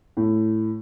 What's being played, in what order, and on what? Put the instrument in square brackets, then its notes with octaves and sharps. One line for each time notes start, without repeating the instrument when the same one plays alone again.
[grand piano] A2